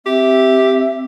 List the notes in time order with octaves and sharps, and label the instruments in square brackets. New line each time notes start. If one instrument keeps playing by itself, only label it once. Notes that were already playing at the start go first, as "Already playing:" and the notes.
[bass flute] C4 [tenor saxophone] G4 [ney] E5